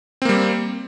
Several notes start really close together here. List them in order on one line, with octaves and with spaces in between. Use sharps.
C4 A#3 G3